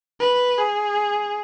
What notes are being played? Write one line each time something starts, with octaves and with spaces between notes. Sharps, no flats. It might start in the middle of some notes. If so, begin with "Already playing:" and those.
B4
G#4